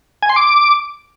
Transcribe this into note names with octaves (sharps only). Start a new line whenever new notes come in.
G#5
C6
D6